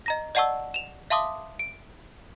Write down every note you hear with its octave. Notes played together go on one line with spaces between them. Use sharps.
D#5 A#5 A#6
D5 D#5 F#5 A5 C#6 E6
E7 F7
E5 F5 A5 C6 D6 D#6
D7